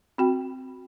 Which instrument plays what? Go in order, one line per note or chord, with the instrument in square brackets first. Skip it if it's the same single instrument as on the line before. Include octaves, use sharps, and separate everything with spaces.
[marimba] C4 F#4 G5